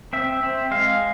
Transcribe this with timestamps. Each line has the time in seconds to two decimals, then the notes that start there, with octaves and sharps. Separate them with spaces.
0.13 C4 E5
0.43 C4
0.71 G#3 F5